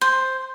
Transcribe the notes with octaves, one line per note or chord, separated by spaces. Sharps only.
C5